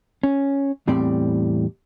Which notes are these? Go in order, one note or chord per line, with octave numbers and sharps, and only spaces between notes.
C#4
E2 A2 G3 C4 D5